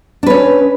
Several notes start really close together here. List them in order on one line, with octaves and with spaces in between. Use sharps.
D4 B4 C#4